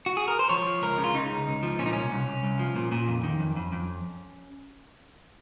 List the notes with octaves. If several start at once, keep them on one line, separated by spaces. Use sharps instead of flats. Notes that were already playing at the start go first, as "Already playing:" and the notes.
F#4
G#4
A#4
C5
F3 C#5
F3
C#2 A#4
C#3
F4
C#3 D#4
C#2
C#2
F3
A#2 C#4
D#4
C2 C#4
C2
C2
C2
F3
A#2
A#2
F2
D#3
F2
F2
F2